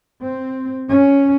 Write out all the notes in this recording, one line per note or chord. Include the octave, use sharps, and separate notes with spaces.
C4
C#4